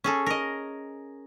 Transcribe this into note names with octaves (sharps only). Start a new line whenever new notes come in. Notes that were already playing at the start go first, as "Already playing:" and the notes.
C#4 G#4 A4
A#4 D#5